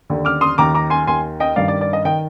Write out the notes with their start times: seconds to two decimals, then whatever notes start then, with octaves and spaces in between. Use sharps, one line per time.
0.10 D#2 D3
0.25 D6 F6
0.41 C6 D#6
0.58 D#2 D#3 A#5 D6
0.74 A#5 D6
0.90 G#5 C6
1.07 D#2 D#3 G#5 C6
1.40 D#5 G5
1.56 G2 D#3 D5 F5
1.68 D5
1.81 D5
1.93 D#5
2.05 D#3 D#5 G5